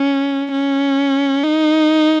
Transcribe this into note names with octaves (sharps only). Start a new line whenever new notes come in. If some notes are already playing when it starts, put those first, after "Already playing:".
Already playing: C#4
C#4
D#4